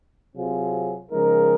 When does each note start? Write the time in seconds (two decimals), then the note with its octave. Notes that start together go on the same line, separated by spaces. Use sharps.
0.36 C3 F#3 C4 F4 G#4
1.10 C#3 F3 G#3 D#4 A#4